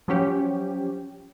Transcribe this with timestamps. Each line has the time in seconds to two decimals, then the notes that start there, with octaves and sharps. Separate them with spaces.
0.08 F3 F#3 C#4 G4